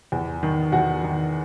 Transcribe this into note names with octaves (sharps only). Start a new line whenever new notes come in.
E2
D#3
E2 F#4 F#5
D#3